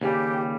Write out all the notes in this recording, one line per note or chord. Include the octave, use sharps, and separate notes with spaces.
D#2 C#3 G3 G4